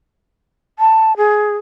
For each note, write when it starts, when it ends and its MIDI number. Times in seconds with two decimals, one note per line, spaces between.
0.79 1.16 81
1.17 1.57 68